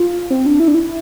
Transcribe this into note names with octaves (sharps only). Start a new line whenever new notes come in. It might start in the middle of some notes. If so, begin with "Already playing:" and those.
Already playing: F4
C4
D4
E4
D4
E4